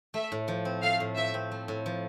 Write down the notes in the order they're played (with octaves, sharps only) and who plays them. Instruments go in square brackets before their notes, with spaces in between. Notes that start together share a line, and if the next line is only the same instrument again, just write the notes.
[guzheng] A3 [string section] E5
[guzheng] A2
F3
C4
[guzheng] A3 [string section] F5
[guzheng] A2
[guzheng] F3 [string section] E5
[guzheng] C4
A3
A2
F3